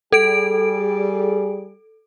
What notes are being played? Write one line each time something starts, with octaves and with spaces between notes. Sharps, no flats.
G3 G#4 A4 D7